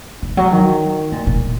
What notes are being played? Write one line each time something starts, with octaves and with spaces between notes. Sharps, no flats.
D#3
F#3
D#3
A#2
A#2